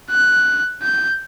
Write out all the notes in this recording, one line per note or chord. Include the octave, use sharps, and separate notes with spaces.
F#6
G6